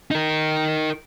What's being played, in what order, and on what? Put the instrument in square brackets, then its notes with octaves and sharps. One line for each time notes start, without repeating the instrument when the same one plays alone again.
[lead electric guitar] D#4 A#4